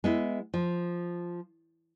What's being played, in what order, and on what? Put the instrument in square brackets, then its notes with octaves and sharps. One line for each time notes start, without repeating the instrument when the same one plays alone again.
[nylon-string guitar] G#3 B3 E4
F3